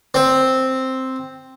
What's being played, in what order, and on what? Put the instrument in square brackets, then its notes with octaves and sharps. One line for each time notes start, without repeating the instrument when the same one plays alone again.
[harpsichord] C4